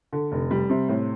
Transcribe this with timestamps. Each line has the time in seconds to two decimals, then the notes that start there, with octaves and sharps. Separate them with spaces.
0.12 D3
0.32 F1
0.51 G3
0.70 C3
0.89 A2